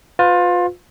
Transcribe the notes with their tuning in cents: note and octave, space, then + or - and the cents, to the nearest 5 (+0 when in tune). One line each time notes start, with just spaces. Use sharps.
F4 +25 B4 +35